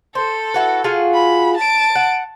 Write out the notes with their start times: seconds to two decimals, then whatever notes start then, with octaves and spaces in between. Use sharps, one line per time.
0.15 A4 C5
0.54 E4 F#4 B4
0.84 F4 F#4 G#4
1.14 B5
1.57 A5 D7
1.95 F#5